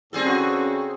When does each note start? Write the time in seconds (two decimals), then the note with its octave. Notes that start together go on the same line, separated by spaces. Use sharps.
0.13 A2 G3 C4 G#4 A4
0.24 C#3 E3 D4 F#4